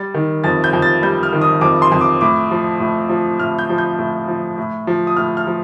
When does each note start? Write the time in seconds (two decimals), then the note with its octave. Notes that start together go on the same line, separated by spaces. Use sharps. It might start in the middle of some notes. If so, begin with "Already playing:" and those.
Already playing: G3 A6
0.14 D#3
0.44 F2 A6
0.64 G6
0.73 F2
0.82 A6
1.03 G3 G6
1.23 F6
1.33 D#3
1.41 D#6
1.61 F2 D6
1.82 C6
1.92 F2
2.01 D6
2.21 A2 D6
2.51 F3
2.80 A2
3.09 F3
3.39 A2 F6
3.58 G6
3.70 F3
3.78 G6
3.99 A2
4.28 F3
4.58 A2
4.87 F3
5.07 D#6
5.17 A2 F6
5.37 F6
5.47 F3